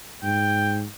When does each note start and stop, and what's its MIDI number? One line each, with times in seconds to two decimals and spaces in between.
0.23 0.85 44
0.23 0.77 79